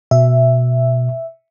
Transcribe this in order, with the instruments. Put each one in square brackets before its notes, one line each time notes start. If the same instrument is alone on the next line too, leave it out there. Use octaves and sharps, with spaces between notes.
[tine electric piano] B2 [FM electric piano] E5